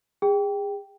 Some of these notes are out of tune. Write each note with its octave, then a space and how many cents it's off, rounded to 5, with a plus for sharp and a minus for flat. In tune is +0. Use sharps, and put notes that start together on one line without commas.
G#4 -30 G5 +0